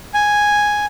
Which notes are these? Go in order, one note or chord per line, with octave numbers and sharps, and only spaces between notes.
G#5